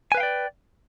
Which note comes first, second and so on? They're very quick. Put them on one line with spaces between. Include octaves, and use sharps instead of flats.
G#5 B4 F5 G5 D5